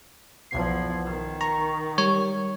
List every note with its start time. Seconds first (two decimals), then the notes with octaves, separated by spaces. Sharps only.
0.51 B1 E2 F3 G#6 C7
1.06 D#3
1.41 A#5 C#6
1.98 G3 C#5